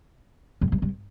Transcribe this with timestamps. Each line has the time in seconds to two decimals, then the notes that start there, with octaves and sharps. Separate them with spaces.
0.61 F2
0.72 G2
0.82 G2